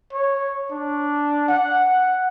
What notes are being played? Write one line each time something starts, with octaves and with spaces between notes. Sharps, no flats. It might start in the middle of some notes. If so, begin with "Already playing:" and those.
C#5
D4
F#5